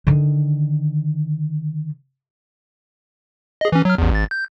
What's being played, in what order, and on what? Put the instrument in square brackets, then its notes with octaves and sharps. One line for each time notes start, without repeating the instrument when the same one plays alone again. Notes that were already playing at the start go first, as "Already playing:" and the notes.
[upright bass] D3 D#3
[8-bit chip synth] G#4 D#5
E3 C#4
F#3 F6
A1 E2
G#1 A6
G6